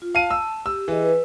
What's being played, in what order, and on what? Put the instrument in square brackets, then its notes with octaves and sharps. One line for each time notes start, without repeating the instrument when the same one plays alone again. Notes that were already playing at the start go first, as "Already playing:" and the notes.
[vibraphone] F4
[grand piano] F5 D#7 [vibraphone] A5
[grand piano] E6
[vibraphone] G4 [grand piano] E6
[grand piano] E3 [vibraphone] G#4 D#5
[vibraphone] B4